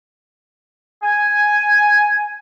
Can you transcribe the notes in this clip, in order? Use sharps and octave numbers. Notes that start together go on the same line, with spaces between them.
G#5